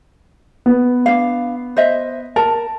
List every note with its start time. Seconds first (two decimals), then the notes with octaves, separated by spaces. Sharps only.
0.66 B3
1.06 D4 F5
1.77 C5 D#5 E5
2.36 A#4 A5